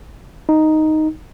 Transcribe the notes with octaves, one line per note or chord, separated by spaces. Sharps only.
D#4